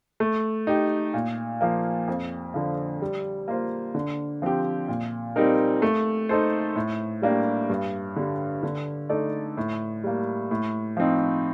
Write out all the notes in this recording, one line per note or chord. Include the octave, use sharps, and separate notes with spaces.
A3
D#4 G4
A#2
F3 A#3
F2
D3 F3
G3
A#3 F4 C5
D3
F3 C4 G4
A#2
G3 C4 D#4 A#4
A3
D#4 A4 C5
A2
G3 A#3 D4 G4
G2
D3 G3
D3
A3 D#4 A4 D5
A2
G3 A#3
A2
F3 C4 D#4